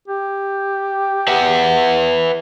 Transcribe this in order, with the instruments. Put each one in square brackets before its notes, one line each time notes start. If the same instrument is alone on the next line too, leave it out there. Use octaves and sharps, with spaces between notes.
[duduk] G4
[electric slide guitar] B4 E5 F#5